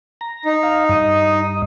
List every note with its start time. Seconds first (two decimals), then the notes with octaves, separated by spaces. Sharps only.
0.21 A#5
0.45 D#4
0.63 F5
0.89 G2 D#5